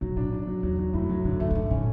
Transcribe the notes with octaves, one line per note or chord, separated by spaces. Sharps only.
B2 F#3
A2 D4
D4
F#2 F#3
E2 F#3
F#3
F#2 A2
F#3
G#2 D3
F#2 A3
F#2
G#2 D3
A2 C#4